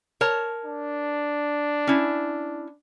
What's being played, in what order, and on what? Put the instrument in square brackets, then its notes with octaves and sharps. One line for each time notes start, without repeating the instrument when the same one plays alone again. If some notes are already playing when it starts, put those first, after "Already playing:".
[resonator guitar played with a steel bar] A#4 C#5 A5
[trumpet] D4
[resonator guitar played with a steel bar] C#4 E4